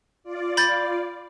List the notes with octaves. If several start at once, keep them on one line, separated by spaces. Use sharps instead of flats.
F4 D5
B5 G6 A6